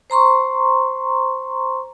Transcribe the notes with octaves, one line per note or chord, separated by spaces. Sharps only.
C5 A#5 C6 C#6